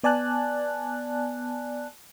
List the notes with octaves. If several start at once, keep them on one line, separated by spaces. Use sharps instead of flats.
B3 D5 G#5 A5 F#6